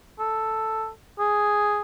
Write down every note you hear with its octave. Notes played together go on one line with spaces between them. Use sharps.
A4
G#4